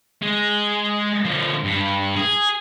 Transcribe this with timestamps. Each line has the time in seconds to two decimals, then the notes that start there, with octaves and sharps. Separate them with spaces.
0.22 G#3
1.25 D3 F3
1.64 G2
2.16 G#4